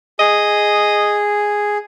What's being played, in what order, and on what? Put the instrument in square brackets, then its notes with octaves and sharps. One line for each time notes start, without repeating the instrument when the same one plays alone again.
[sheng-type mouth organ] G#4 [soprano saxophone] D#5